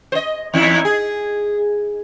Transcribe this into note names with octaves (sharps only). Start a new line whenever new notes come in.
C5 D#5
E2 D#4 E4
G#4